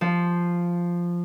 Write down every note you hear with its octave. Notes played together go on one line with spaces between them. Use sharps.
F3